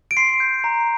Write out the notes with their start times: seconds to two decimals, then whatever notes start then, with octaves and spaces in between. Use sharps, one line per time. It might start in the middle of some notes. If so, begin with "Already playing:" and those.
0.11 D7
0.17 C6 C7
0.40 G6
0.64 A#5